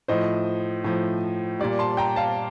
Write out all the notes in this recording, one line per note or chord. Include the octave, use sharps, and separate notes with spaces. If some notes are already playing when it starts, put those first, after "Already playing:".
A2 F3 C5 D#5
A2 F3
A#2 G3 D5
A5 C6
G5 A#5
F5 A5